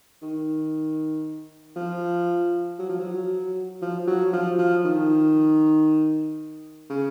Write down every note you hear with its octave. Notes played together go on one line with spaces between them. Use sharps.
D#3
F3
F#3
F3
F#3
F3
F#3
F3
F3
D#3
C#3